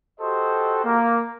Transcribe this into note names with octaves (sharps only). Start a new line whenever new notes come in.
F#4 G4 A4 C5 D#5
A#3